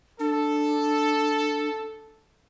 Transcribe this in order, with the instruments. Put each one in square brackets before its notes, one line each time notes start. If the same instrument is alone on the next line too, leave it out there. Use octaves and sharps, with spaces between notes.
[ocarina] D4 [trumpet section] A4